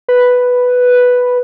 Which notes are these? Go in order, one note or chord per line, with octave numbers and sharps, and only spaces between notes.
B4